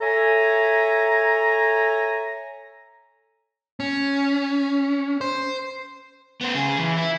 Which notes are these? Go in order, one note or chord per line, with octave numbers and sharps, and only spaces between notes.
A4 C#5 E5 G#5 A#5
C#4
C5
B3 C5
C#3 G#4
E3
E4